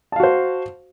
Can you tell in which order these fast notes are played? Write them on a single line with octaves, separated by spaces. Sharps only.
A5 F5 F#4 C5